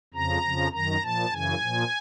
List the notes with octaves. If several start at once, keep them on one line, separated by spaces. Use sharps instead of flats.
F2 C#3 F3 A#5
F2 C#3 F3
F#2 D#3 A#5
A#2 F3 A5
F#2 C#3 E3 G#5
A#2 F3